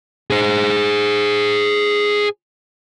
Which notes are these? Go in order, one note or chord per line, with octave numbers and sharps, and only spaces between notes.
G#4 C5